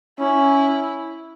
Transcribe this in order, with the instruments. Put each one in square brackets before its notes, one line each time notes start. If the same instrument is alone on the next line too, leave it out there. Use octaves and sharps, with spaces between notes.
[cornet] C#4 [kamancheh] E4